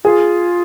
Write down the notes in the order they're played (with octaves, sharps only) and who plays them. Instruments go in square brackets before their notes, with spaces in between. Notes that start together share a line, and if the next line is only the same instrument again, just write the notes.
[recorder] F4 [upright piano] G#4